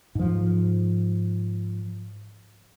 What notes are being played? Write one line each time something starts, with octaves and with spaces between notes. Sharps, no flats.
G#2 F3